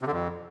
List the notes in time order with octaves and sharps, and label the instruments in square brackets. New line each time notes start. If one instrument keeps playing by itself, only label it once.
[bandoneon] C3
D3
F2